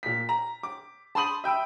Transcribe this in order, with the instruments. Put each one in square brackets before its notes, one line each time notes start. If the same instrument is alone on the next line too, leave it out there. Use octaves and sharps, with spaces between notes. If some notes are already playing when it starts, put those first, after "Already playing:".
[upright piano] A#2 B6
A#5
D6
A5 B5 C6 D#6 D#7 F#7
E5 G5 B5 E6